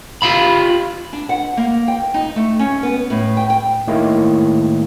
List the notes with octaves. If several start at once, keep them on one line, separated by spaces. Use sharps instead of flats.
F4 G4 F5 B5
D4
F#5
A#3
G5
D#4
A3
C#4
B3
A2
G5
G5
A2 D#3 G#3 A#3 E4